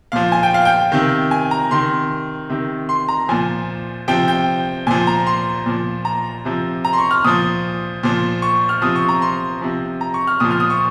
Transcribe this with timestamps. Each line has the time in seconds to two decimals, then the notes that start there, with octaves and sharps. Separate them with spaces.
0.12 A#2 F3 F5
0.32 G#5
0.43 G5
0.54 F5
0.65 G5
0.92 C3 D#3
1.31 G#5
1.51 A#5
1.71 C3 D#3 C6
2.49 C3 D#3
2.89 C6
3.08 A#5
3.29 A#2 F3 G#5
4.08 C3 F3 G5
4.28 G5
4.87 A#2 F3 G#5
5.07 A#5
5.27 C6
5.66 A#2 F3
6.05 A#5
6.45 C3 F3
6.85 A#5
6.93 C6
6.98 C#6
7.11 F6
7.24 A#2 F3 D#6
8.03 A#2 F3
8.42 C#6
8.69 F6
8.82 C3 F3 D#6
8.96 C#6
9.08 A#5
9.22 C6
9.61 C3 F3
10.01 A#5
10.14 C#6
10.27 F6
10.40 A#2 F3 D#6
10.51 F6
10.60 D#6
10.70 C#6